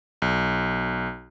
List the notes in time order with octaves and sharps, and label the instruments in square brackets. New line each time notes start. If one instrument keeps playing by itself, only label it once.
[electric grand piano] B1